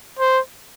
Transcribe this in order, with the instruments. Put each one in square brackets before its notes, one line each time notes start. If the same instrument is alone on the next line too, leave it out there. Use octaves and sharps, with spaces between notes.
[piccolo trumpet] C5